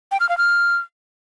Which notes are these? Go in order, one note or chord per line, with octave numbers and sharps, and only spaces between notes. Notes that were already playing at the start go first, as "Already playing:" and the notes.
G5
F6
F5
F6